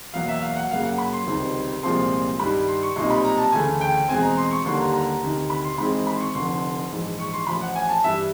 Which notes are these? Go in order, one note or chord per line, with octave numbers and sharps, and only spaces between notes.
E2 B2 F#3 A#3 F5
E5
F5
F#5
F#2 C#3 F#3 A#3 F5
F#5
B5
C6
C#2 C3 D#3 G3 C4
C2 A#2 F3 G#3 C4 C6
G2 D#3 G3 B5
C6
C#6
B1 A#2 G3 C4 D#4 C6
B5
A#5
A5
D2 C#3 E3 A3 C#4 G#5
G5
E2 B2 G#3 C4 G#5
A#5
C6
C#6
D#2 D3 G3 A#3 C6
A#5
A#5
D2 C3 D#3
B5
C6
G#1 G#2 E3 G#3 C4 B5
B5
C6
C#6
F1 F2 D3 C6
A#1 G#2 E3
C#6
C6
A1 A2 F3 B5
F#5
G#5
A5
G2 E3 G3 E5